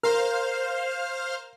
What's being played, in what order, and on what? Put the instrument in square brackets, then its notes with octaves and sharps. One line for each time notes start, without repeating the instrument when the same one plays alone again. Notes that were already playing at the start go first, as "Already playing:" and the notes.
[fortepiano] A#4 [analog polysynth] C5 F5 F6